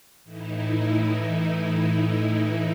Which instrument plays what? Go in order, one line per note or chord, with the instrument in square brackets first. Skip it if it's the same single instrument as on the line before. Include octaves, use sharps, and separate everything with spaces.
[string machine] A2 E3 D#4 E4